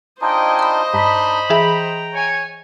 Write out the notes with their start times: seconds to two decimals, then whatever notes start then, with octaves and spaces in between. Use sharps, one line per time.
0.21 D4 D#4 F4 C5 D#5 G5 G#5
0.59 B5 C6
0.94 G2 D4 D#4 B5
1.50 E3 G#4 E5 G5 A#5
2.13 C#5 G#5